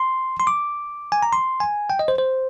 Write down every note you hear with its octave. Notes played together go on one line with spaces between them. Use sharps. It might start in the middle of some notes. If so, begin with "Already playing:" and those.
Already playing: C6
C6
D6
G#5
A#5
C6
G#5
G5
D#5
C5
C5